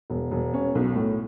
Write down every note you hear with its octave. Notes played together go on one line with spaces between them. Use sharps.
E1
E1
C#4
B1
A2